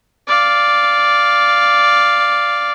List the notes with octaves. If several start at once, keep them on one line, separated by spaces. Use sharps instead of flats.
D5 F5